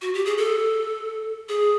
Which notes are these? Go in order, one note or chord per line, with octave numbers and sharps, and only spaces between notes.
F#4
G4
G#4
A4
G#4